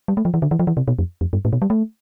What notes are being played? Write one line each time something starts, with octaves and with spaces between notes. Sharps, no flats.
G3
A3
F3
E3
D3
E3
F3
E3
C3
B2
F2
F2
G2
A2
B2
G3
A3